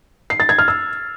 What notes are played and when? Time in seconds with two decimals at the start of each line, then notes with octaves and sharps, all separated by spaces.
0.30 C7
0.40 A6
0.49 G#6
0.59 F6
0.68 E6